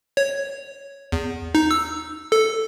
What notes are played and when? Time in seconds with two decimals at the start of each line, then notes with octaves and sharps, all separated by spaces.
0.17 C#5
1.12 E2
1.55 D#4
1.71 E6
2.32 A4